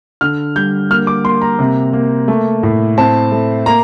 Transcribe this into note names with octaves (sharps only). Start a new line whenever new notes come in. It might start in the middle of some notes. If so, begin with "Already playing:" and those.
D3 F6
G3 G6
A#3 F6
D6
A#3 C6
A#5
C3
A#3
A3
A2
C4 A5
A3
A#3 A#5